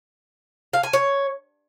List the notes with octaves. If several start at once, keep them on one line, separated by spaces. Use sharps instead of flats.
F5
G#5
C#5